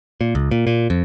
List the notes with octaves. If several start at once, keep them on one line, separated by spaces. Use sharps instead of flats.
A#2
C#2
A#2
A#2
F2